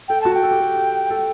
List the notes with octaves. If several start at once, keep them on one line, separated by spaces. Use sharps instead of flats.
A4 G5
F#4 A5
G5
A4
G4
A4
G4
A4